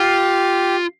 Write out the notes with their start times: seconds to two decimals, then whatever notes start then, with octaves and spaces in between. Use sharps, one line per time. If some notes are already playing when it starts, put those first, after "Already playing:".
Already playing: F4 G4